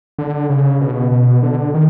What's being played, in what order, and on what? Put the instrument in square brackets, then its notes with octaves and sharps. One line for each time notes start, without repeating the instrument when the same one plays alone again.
[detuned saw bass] D3
C#3
B2
B2
D3
D#3